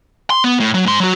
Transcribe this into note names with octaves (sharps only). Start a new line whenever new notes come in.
C6
B3
A2
F#3
G#2 C6
F#3 F#4